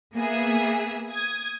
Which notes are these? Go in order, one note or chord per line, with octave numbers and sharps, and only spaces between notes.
A#3 B3 G#4 E5
D#6 G#6